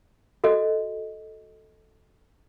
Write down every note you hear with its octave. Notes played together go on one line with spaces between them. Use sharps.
F#4 A4 D#5